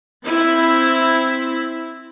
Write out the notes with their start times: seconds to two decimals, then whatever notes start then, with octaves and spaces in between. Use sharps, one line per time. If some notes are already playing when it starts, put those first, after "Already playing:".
0.25 C4 E4